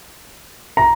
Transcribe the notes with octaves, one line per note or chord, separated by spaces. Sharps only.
A#5